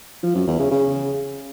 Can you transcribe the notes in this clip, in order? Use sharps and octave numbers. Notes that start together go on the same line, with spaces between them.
F3
F#2
E2
C#3
C#3